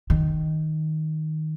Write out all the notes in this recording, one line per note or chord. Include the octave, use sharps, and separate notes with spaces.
D#3